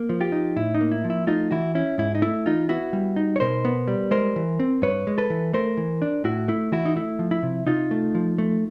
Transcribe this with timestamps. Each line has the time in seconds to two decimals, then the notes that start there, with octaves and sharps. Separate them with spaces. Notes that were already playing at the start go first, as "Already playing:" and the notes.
Already playing: A#3
0.09 F3
0.21 F4 G4
0.32 D#4
0.56 A2 E4
0.74 D#4
0.81 A#3
0.92 E4
1.04 F3
1.10 E4
1.27 A3 D#4 F4
1.51 E3 E4 F#4
1.75 C#4 E4
1.98 G#2 E4
2.15 D#4
2.22 A3 E4
2.46 E3 D#4 F4
2.69 B3 E4 F#4
2.93 G3
3.16 D#4
3.36 C#5
3.40 B2 A#4 C5
3.65 B3
3.88 G3
4.11 G#3 A#4 C5
4.36 E3
4.59 C4
4.82 G2 B4 C#5
5.07 G#3
5.18 A4 B4
5.30 E3
5.53 A3 A#4 C5
5.77 E3
6.02 D4
6.24 A2 E4 F#4
6.48 A3 E4
6.72 E3 E4 F#4
6.85 D#4
6.96 A3 E4
7.19 F3
7.31 E4
7.43 C3
7.67 C3 D#4 F4
7.91 A3
8.15 F3
8.38 A3